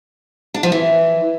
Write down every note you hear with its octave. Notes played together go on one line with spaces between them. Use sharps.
D4
F3
E3